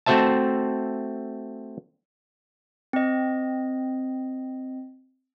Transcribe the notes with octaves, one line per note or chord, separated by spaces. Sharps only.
A3 C4 F#4 C5 E5 A5
C4 D#5